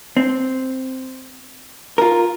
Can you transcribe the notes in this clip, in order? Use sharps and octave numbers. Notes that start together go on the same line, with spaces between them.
C4
F4 A#4